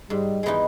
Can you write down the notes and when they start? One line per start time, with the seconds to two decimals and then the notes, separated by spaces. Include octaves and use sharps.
0.10 G#2 G3
0.43 E3 G#3 B3 D#4